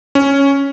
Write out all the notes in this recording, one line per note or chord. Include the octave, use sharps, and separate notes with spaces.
C#4